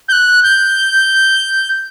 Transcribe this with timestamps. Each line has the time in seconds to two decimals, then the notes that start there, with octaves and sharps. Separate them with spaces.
0.08 G6
0.12 F#6
0.43 G6